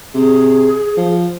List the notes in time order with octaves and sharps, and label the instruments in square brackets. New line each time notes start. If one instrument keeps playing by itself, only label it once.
[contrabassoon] C3 [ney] G#4
[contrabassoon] F3